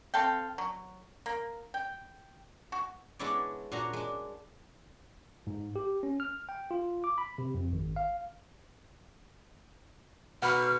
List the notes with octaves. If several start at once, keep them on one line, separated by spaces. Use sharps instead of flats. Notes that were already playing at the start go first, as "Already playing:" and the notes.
C4 A4 F5 G5
F#3
A#3
G5
F#4
G#3 B3 D4 E4 C#5 D5
A#2 D4 F#4 C#5 G#5 A#5
G#3 D4
G#2
G4
C#4
F6
G5
F4
D6
B5
C3
F2
G#1
F5
B2 F#5 B5 F6